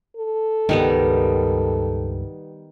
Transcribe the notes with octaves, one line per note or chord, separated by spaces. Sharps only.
A4
C#2 G2 D#3 G3 B3